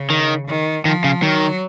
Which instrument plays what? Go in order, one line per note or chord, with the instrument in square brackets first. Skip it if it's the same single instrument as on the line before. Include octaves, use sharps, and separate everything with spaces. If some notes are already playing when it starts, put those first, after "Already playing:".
Already playing: [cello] C#3
[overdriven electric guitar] D#3
[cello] D#3
[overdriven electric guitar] D#3 [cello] F3
[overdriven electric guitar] C#3
[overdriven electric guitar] D#3 [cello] F#3